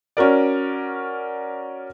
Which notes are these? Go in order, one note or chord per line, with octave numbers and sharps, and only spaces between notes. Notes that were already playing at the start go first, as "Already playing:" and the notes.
C#4 F#4 A#4 D5